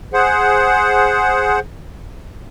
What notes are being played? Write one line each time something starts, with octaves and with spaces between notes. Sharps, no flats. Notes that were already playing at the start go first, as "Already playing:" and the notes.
G#4 C5 F#5